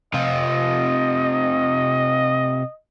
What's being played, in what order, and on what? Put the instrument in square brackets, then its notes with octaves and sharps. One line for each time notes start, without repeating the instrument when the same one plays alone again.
[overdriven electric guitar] C3 F4 [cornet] D#5